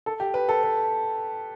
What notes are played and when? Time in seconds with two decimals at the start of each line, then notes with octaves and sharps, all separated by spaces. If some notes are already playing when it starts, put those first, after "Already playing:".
0.06 A4
0.20 G4
0.34 B4
0.49 A4
0.63 B4